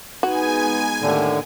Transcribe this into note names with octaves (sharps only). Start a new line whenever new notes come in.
G#3 B3 D#4 F#4 G#5
D#2 A2 D3